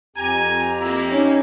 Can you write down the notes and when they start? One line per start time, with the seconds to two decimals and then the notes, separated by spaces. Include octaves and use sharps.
0.17 F2 G4 G#5 A#5
0.81 A#3 E4
1.10 C#4 D#4